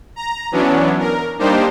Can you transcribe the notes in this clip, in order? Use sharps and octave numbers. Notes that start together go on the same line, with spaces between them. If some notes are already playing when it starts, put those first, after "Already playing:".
A#5
E3 F#3 B3 C#4 D4
A#4
G3 A#3 D4 D#4 G4 C5